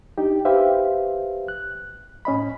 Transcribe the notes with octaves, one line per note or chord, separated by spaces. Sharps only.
D4 D#4 G4
G4 B4 C5 E5 F5
F#6
A2 C#4 D#5 B5